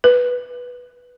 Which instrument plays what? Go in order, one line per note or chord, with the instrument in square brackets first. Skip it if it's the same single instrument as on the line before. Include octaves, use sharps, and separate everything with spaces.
[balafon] B4